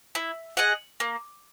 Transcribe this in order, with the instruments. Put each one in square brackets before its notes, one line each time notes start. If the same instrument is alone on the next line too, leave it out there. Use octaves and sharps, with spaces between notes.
[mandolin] E4
G#4 D#5 F#5
A#3